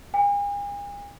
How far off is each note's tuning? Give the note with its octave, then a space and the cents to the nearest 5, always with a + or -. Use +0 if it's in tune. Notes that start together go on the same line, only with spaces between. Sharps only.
G#5 -40